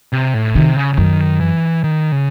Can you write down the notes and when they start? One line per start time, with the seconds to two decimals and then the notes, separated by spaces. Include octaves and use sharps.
0.13 C3
0.34 A2
0.55 C3 D#3
0.76 C#3
0.93 C#3
0.98 F#2 D#3
1.40 E3
1.84 D#3
2.12 C#3